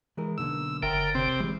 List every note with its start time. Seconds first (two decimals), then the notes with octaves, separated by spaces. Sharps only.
0.17 E3 G#3 A#4
0.38 B1 D3 A#3 E6
0.83 F#1 D3 A#4 E5 G5 C6
1.15 C3 C4
1.40 E3 G3 G#3